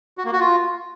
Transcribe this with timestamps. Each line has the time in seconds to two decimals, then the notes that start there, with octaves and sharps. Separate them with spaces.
0.18 F#4
0.25 A#3
0.32 F#4
0.40 F4